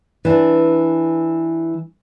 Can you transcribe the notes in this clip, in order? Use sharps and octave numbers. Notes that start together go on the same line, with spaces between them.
E3 D4